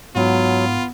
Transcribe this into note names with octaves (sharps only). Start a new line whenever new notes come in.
G#2 F#3 B3 F4